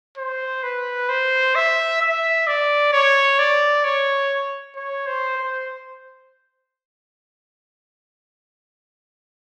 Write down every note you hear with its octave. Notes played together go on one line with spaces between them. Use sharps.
C5
B4
C5
E5
E5
D5
C#5
D5
C#5
C#5
C5
C5